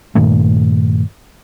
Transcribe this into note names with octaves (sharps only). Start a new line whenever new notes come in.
G2 A#2 D#3 A3